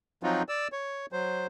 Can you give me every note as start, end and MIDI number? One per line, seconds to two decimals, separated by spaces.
0.23 0.42 53
0.23 0.42 54
0.23 0.42 60
0.23 0.42 63
0.23 0.42 65
0.23 0.42 66
0.49 0.68 74
0.49 0.68 88
0.72 1.06 73
1.12 1.47 54
1.12 1.47 72